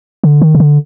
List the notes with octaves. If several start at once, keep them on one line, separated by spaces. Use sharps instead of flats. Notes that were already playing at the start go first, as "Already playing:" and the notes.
D3
D#3
C#3
D3